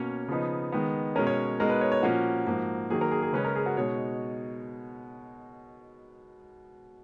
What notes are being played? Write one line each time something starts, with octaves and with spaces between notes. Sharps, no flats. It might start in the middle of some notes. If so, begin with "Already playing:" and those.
Already playing: B2 A#3 C#4 C#5
C#3 F3 B3 D#4
D#3 G#3 B3
B2 G#3 C#4 A#4
C#5
B2 G#3 D#4 A#4
B4
C#5
C#5
A#2 F3 A#3 C#4 F#4
G#2 F3 A#3
D#3 F#3 A#3 G#4
A#4
G#4
G#4
C#3 G#3 C#4 B4
A#4
G#4
F#4
B2 G#3 D#4 C#5